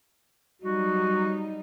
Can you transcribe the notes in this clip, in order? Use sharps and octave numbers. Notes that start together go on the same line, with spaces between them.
F#3 G3 D#4 F#4